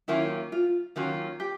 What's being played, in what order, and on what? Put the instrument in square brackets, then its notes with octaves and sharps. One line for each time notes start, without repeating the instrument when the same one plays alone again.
[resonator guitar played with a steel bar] D#3 F#3 A#3 C#4 F4 [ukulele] E4
[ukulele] F4
[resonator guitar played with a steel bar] D#3 F#3 A#3 C#4 F4 [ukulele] F#4
[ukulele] G4